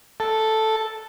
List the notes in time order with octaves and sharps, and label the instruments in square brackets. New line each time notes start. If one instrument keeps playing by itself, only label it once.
[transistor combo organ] A4